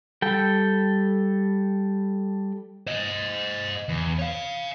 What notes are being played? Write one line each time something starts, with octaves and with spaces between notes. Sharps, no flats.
G3 A4 G5
C5 D#5
E2
C#5 F5